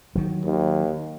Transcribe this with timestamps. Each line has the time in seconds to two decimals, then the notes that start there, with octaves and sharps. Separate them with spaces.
0.15 D#3 F#3
0.44 D#2